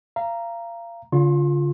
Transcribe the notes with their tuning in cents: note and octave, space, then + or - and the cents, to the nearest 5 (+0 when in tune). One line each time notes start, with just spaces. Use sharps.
F5 -30 A#5 +0
D3 -45 F4 +0 C6 +35